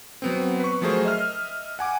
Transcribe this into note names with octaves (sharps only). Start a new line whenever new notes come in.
F#3 B3 C4
B4 C#6
F3 F#3 A3 G#4 A#4 C5
D#5 E5 F6
F#5 G#5 D6